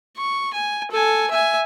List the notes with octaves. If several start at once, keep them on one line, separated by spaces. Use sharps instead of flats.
C#6
G#5
A4 G#5
E5 G#5